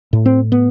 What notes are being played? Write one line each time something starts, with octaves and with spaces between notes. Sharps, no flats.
A2
C4
B3